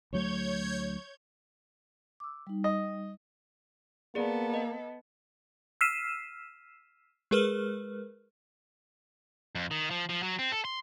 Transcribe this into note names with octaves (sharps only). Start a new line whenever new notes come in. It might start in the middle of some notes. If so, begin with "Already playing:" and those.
D2 F#3 A3 C#5 G6 G#6
D6 E6
G3 D#4
D#5
A#3 B3 G#4 A4 D5
D#5
E6 F6 B6 C7 D#7 E7
G#3 G#4 A#4 B4 F6
F2
D#3
F3
F3
F#3
C4
A4
C6